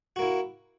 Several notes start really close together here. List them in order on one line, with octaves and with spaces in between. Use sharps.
F#4 A#3 E4